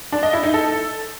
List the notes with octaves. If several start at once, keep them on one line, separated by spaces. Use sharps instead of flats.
D4
D#5
E4
D#4
A4